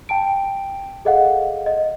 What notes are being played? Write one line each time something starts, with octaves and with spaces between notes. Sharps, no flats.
G5 A5 D7
G#4 A4 D#5 F5 F#5
D#5